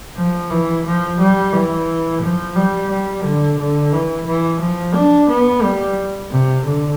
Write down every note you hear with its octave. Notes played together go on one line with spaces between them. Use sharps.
F3
E3
F3
G3
E3
F3
G3
G3
D3
D3
E3
E3
F3
D4
B3
G3
C3
D3